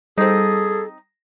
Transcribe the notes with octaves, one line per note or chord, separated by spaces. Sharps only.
G3 C4 D#4 G#4 A4